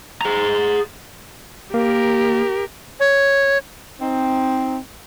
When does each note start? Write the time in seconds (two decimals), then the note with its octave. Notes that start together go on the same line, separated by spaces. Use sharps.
0.21 G#4 A#5
1.74 A#3 G4 A#4
3.00 C#5
4.01 C4 D#4